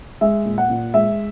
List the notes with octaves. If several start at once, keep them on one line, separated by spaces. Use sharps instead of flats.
G#3 E5
A#2
F#5
A#2
G#3 E5